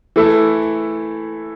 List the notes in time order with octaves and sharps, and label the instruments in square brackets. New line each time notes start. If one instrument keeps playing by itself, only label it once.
[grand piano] E3 A3 E4 A4